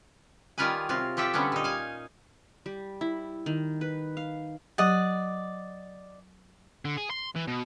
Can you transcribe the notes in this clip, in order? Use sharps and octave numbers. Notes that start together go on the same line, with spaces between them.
D#3 G3 F4 A#4 B4 G#5
C3 F#3 F4
F3 G4 A4 E5 G5
D3 G3 B3 C#4
A#2 D#4
F5 G#5
G3
E4
D#3
B4
F5
F#3 G4 D5 D#5 F#5
D3
G#4
C6
E3
B2